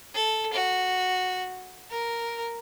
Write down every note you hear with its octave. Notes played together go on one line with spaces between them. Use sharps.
A4
F#4
A#4